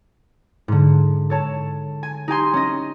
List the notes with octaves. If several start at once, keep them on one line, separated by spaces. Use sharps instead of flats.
G#2 D3
A4 C#5 A5
G#5
D#4 G4 G#5 C6
C#4 D#5